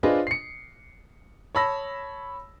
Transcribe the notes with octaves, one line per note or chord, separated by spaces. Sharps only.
D4 F4 G#4 B4 C5 D#5
C7 C#7
C#5 A5 B5 E6 A#6